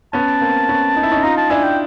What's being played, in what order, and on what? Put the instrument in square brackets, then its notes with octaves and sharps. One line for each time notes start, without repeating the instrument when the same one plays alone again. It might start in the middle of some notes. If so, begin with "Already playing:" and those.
[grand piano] B3 C#4 [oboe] A5
[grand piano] A#3 C4
B3 C#4
D#4
E4
C#4 D#4
E4
[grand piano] D#4 F4 [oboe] A#5
[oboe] A5
[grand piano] D4 E4 [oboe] G#5
[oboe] G5